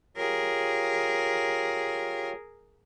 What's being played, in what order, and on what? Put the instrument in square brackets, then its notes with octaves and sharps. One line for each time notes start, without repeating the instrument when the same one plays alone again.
[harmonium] F4 G4 C#5 [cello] G#4 A#4